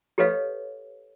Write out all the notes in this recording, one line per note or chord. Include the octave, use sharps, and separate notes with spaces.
G4 A4 B4 C#5 D#5 F5